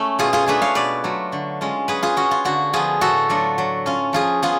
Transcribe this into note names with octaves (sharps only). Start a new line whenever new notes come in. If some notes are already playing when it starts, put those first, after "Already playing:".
Already playing: A3 C#4
B2 F4 G#4
F4 G#4
A3 D4 F4 G#4 B4
C#5 F5
B2 B4 D5
F#3 A3 F4
D3
G#3 C#4 F4
F#3 G#4 B4
F4 G#4
C#4 F4 F#4
F4
D3 F#4
F3 B3 F4 G#4
A2 F#4 A4
F#3 A3 D4 F4
F#3
C#4 F4
F3 F4 G#4
B3 F4 G#4